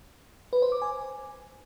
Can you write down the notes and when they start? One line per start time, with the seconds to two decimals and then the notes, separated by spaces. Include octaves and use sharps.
0.53 B4
0.62 C5
0.72 D6
0.82 G#5